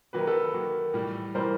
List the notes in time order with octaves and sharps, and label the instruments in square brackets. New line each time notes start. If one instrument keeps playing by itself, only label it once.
[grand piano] D#3 F#3 A#3 [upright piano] B4
[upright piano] A#4
A4 B4
[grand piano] D#3 F#3 A#3
A2 E3 G3
[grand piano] A2 E3 G3 [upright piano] A#4 C5